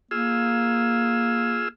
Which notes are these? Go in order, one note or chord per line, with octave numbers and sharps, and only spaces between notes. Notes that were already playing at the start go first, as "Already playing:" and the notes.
A#3 F4 G#4 E6